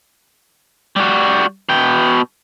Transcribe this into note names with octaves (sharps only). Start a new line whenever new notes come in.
G3 F#4
B2 G5